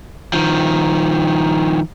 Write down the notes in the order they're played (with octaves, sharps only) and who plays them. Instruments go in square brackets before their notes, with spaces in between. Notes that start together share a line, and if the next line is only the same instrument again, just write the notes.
[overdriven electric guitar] D#3 F3